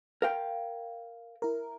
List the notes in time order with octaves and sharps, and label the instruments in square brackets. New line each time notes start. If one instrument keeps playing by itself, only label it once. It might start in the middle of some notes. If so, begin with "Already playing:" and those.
[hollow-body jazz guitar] A#4 F5 G5
[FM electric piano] E4 A#4